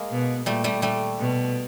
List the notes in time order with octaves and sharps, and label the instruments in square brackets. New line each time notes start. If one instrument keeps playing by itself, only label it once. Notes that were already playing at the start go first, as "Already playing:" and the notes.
Already playing: [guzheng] G#3 A#3
[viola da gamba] B2
[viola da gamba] A#2 [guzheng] G3 A3
[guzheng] G3 A3
G3 A3
[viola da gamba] B2